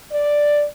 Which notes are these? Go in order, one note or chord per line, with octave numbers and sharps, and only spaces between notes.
D5